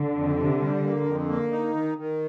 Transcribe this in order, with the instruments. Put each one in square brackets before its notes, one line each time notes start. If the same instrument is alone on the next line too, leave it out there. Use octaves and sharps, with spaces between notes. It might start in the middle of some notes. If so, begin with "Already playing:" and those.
Already playing: [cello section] D3
[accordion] F2
C3
G3
A#3
F2
A#3
D#4
D#3
D#3